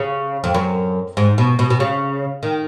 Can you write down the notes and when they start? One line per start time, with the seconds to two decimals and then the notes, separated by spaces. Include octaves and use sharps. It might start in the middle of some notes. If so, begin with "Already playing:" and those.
Already playing: C#3
0.44 F2
0.54 F#2
1.17 G#2
1.38 B2
1.59 B2
1.70 B2
1.80 C#3
2.43 D#3